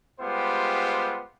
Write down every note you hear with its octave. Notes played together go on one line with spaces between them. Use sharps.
G3 G#3 B3 F4 G4 C5